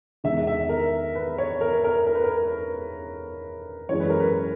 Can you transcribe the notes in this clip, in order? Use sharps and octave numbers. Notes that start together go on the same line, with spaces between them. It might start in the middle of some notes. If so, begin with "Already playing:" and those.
E2 D#3 G#3 E5
E5
A#4
B4
C#5
A#4
A#4
A#4
B4
A#4
F#2 E3 G#3 C#5
B4
A#4
B4